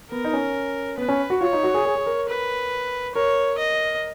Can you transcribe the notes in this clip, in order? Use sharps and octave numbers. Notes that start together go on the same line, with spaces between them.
B3 A#4
D#4
C#4
B3 B4
C#4
F#4
F4 C#5
D#4
F#4
G#4
G#4
G#4
A#4
B4
A#4 C#5
D#5